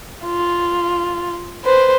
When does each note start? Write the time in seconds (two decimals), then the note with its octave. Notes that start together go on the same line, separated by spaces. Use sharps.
0.24 F4
1.65 B4 C5